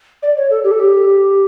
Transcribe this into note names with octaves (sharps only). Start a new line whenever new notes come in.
D5
C#5
A4
G4
A4
G4